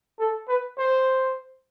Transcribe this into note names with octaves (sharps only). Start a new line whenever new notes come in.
A4
B4
C5